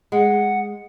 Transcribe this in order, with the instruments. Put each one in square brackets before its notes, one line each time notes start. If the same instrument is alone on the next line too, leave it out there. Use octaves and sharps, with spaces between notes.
[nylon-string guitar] G#3 [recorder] F#5